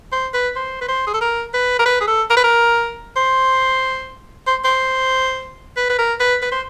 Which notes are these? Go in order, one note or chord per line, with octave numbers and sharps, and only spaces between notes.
C5
B4
C5
B4
C5
G#4
A4
A#4
B4
A#4
B4
G#4
A4
A#4
B4
A#4
C5
C5
C5
B4
B4
A#4
B4
B4
C5